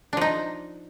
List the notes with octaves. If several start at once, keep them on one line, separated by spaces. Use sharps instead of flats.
F3 D4 D#4